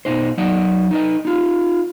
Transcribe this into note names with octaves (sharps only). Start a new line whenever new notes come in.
B2 D#4 C5
F#3 D#4 D5 F#5
D#4 B4 D#5
D#4 F4